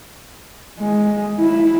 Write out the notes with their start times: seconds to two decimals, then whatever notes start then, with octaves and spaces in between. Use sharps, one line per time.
0.80 G#3
1.40 E4